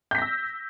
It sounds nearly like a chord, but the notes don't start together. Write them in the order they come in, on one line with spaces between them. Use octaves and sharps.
G6 B6 A#6 E6